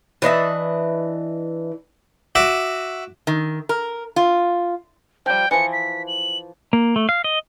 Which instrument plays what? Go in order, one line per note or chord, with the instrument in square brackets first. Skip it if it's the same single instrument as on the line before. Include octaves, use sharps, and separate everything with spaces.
[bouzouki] E3 D4 D#5 E5
[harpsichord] F#4 E5 D6
[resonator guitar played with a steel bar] D#3
A#4
F4
[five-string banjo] F3 G3 [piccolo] G5
[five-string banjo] E3 F3 [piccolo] C#7
[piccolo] B6
F#7
[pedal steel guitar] A#3
A3
F5
D#5